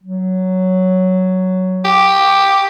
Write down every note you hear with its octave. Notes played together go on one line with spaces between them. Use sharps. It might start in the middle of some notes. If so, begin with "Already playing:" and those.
F#3
G4